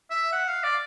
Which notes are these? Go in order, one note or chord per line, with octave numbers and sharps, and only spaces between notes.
E5
F#5
F5
D5